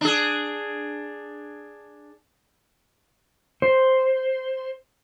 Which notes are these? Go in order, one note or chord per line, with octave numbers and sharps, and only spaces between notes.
D4 G#4
C5